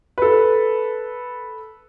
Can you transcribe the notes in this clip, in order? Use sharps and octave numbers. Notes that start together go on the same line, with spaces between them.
A4 B4